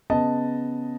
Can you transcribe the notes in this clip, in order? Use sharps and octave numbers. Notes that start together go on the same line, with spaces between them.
C#3 B3 D#5 A5